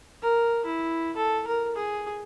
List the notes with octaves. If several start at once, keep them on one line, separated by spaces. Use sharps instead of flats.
A#4
E4
A4
A#4
G#4